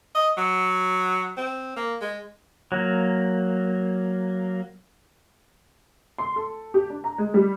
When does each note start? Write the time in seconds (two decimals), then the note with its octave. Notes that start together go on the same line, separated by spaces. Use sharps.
0.15 D#5
0.37 F#3
1.37 C4
1.76 A#3
2.01 G#3
2.72 F#3 A#3
6.18 C6
6.36 A4
6.74 G4
6.90 D4
7.04 A#5
7.18 G#3
7.34 G3